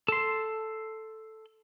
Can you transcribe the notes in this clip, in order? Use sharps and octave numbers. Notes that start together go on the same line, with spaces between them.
A4 C6